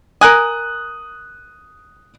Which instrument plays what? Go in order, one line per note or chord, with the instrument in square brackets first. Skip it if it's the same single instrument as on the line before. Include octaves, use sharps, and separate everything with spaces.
[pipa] A#4 G#5 [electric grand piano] D#6 F#6